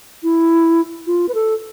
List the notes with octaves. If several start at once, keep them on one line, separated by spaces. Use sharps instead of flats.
E4
F4
B4
A4